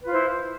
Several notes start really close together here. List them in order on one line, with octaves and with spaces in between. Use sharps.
B4 F4 C5 E4